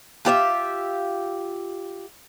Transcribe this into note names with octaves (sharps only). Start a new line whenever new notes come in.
F4 G4 C5 E5